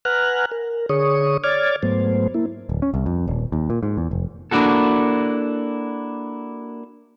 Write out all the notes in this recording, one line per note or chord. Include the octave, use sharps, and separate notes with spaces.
B4 F#5 G#5 A#5 F6 F#6
A#4
D3 G#4 C#5 C#6 D#6
C#5 D5 D6 F6 G#6 A6
G#2 F#3 A3 B3 C5
A#3 E4
D1
C#4
C2
F2
D#1
D#2
A#2
G#2
E2
F1
A#3 D4 E4 F#4 A4